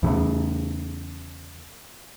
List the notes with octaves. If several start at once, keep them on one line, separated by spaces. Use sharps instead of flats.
E2 C#3